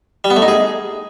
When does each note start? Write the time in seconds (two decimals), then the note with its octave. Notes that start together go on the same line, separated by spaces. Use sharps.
0.24 G3
0.30 B3
0.36 A3
0.42 D#4
0.48 G#4